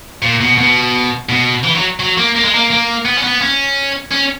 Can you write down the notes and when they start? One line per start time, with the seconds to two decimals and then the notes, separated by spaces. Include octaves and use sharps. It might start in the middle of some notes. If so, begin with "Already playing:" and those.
0.22 A#2
0.41 B2
0.58 B2
1.29 B2
1.64 E3
1.76 F#3
2.00 F#3
2.17 A#3
2.36 A#3
2.44 G#3
2.55 A#3
2.71 A#3
3.05 B3
3.18 C#4
3.24 B3
3.41 C#4
4.12 C#4